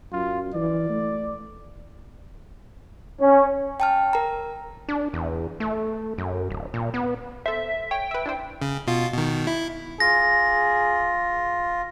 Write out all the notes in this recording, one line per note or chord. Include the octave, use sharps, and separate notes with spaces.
F#2 F4
E3 D5
A3
C#4
G5 A5 F6
A#4 A#5
D4
E2
A3
F#2
D1
A#2
B3
A4 C5 E5
C#5 G5
B4 E5
D4 E4 C5
C#3
B2 F4
B2 D#3
E4
F4 G#4 A#6